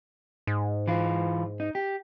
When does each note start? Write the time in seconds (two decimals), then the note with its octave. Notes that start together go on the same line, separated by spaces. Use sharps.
0.47 G#2
0.88 E3 F4
1.60 D#4
1.75 G4